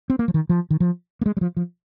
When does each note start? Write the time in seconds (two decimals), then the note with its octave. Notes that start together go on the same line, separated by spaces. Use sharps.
0.10 C4
0.19 A#3
0.28 F3
0.34 D#3
0.49 F3
0.70 D#3
0.80 F3
1.21 A#3
1.26 G#3
1.37 G3
1.41 F3
1.57 F3